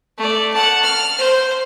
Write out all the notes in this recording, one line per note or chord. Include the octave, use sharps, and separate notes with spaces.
A3 D5
F#5 A5
F6
C5